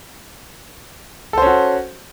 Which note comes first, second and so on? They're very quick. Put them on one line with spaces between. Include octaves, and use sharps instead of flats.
A4 C5 C#4 F#4